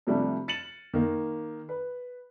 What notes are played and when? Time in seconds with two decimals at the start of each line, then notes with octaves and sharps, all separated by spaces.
0.07 C3 F3 G3 A3 D4
0.48 A6 C#7 D#7 E7 F#7
0.94 D#3 A#3
1.69 B4